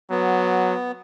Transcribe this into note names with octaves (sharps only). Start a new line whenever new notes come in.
F#3 B3